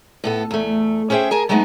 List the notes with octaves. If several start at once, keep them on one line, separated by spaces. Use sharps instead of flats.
A2 B3 A4
E2 A3
C#4 G#4 C5 E5 G5
G#4 A#4 G#5 A5
F#3 G#3 A3 B3 D#4